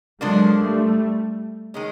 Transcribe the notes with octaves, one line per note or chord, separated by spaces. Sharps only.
D3 F3 F#3 G#3 A#3 D4
G3 A3
D#3 G#3 C#4